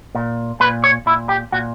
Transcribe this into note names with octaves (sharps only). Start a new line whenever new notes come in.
A#2
A#2 B4
C#5
A#2 E4
G4
A#2 F#4